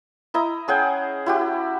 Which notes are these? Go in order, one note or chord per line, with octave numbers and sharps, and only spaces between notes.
E4 D#5 A#5
C#4 G#4 F#5 G5
E4 F#4 G4